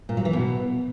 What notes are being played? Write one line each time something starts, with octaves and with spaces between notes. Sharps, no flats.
A#2
F#3
E3
B2